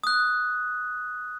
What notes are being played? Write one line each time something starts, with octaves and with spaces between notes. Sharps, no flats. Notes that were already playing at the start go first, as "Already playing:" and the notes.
D#6 F#6